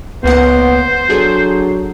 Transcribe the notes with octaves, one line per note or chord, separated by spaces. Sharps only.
C#2 A#3 B3 C5 F#5
F#3 D4 G#4 A4